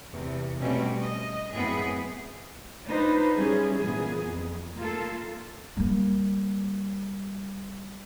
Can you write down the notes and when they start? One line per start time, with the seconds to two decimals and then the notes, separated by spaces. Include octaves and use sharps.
0.11 E2 C3
0.60 B2 G3 A3 C4 C#4
1.00 D#5
1.54 F#2 A2 B3 C4 E4 G#4
2.86 D4 D#4 F4 B4 C5
3.37 G3 C#4 E4 G#4
3.81 A#2 E3 B3 G#4
4.27 F2
4.78 A#3 F4 A4
5.77 G3 A#3